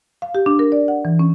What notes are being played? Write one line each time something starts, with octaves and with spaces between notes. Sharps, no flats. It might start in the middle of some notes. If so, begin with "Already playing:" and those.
F5
G4
D4
A#4
D5
F#5
E3
C#4